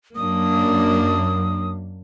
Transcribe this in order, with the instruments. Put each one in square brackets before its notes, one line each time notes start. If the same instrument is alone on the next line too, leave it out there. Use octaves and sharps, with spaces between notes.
[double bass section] F#2 [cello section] A#3 D4 [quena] D#6